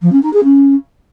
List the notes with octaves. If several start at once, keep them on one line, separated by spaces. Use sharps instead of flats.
F3
C#4
D#4
G#4
C#4